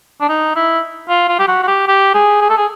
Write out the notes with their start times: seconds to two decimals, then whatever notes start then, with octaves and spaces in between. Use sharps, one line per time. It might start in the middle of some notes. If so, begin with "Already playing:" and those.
0.21 D4
0.29 D#4
0.56 E4
1.09 F4
1.28 F4
1.39 G4
1.48 F#4
1.63 F#4
1.67 G4
1.87 G4
2.14 G#4
2.41 G#4
2.49 A4
2.57 G#4